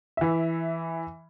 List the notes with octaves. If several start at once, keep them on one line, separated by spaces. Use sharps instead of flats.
E3 E5